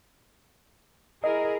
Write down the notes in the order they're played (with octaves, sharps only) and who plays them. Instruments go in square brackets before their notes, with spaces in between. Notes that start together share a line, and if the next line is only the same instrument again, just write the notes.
[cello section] E4 G#4 A#4 [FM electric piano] D#5